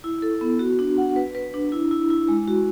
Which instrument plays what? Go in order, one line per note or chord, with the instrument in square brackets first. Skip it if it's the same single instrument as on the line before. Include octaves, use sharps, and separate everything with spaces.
[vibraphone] E4
A4
B3
F#4
D4
F#5
B4
B4
D4
E4
E4
E4
G#3
F#4